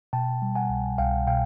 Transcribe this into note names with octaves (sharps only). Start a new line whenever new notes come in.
B2 G5 A5
G3
F#5 G#5
C2
C2 F5 G5
B2 F5 G5